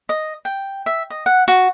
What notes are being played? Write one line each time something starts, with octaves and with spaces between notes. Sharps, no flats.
D#5
G5
E5
D#5
F#5
F#4